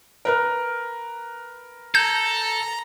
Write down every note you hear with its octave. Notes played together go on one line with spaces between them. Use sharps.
A#4 B4 F6
A4 A#5 G6